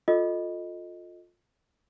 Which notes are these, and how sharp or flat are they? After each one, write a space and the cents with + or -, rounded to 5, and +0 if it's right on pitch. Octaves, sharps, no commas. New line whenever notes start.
F4 +20 A4 +0 D#5 +0